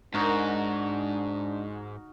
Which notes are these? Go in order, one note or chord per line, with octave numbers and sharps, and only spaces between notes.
G#2 D4 D#4 F#4 A#4